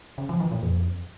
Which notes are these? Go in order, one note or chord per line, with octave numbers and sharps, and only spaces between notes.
C#3
F3
E3
A#2
F2